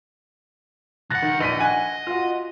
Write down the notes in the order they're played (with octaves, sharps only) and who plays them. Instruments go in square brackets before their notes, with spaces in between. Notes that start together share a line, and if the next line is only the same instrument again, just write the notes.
[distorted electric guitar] C2 F#5 [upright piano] F#6 A6 A#6
[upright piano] D#3
[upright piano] A#1 B6 D#7 [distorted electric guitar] D#5
[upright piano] F#5 G#5 F#6
F4 F#4